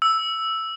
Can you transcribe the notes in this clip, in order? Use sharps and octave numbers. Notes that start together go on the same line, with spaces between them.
E6